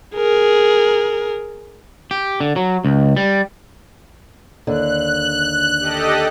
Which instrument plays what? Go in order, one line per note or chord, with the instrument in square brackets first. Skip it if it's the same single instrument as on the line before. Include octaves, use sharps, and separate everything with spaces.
[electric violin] G#4 A#4
[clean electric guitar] G4
D3
F#3
C#2
G3
[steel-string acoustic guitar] D#2 D3 [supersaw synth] F#6
[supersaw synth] G4 A4 D#5